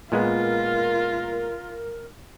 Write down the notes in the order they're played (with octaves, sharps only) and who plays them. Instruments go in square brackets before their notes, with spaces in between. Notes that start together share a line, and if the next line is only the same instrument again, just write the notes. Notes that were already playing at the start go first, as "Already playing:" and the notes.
[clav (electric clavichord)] A#2 G#3 B3 [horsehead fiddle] F4 [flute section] A#4